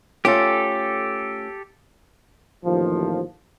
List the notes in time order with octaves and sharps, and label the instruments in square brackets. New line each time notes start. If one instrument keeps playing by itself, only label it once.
[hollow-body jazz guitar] A3 C#4 F4 [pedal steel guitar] G4 A4
[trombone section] A1 D#2 F3